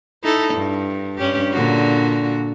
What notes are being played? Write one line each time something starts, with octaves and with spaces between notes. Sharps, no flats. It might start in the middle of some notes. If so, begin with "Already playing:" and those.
D#4 E4 A4
G2
G2 C#4 G4
A#2 D3 F#4